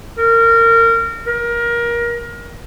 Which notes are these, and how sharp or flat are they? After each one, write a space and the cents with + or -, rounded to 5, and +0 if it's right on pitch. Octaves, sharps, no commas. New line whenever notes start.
A#4 -25
A#4 +25